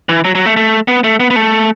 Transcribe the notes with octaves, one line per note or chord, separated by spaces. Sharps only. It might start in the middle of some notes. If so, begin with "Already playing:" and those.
E3
F#3
F#3
A3
A3
B3
A3
B3
B3
A3